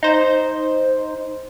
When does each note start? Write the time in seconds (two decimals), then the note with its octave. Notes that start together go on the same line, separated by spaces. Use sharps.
0.03 D#4 C5